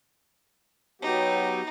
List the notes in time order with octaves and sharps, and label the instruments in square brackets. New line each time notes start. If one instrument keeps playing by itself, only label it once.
[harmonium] F#3 B3 G4 [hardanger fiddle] D#4